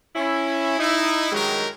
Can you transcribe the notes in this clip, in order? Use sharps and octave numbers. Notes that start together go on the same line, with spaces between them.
C#4 E4
D#4 E4
G2 D#3 F#3 G#3 G4 A#4